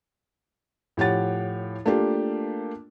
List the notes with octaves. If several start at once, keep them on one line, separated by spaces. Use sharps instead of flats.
A2 F3 G4 C#5 F#5 A6
A3 A#3 D4 F4 G4